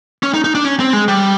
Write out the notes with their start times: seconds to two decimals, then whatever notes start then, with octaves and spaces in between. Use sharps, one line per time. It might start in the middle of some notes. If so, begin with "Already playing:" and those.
0.23 C#4
0.34 D#4
0.44 D#4
0.55 D4
0.65 C#4
0.80 C4
0.93 G#3
1.08 G3